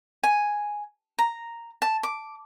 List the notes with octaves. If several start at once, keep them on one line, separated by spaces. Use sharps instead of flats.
G#5
A#5
A5
D6